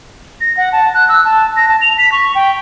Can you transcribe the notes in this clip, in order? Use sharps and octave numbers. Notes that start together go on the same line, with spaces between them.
A#6
F#5
A5
F#6
E6
A5
A#6
A5
F7
B6
C#6
G5